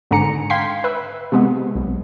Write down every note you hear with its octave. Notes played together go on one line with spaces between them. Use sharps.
G#1 G#2 D3 G#4 A#5 C#7
F5 G5 C6 G#6 B6 C7
B4 E5
C3 G#3 B3
B1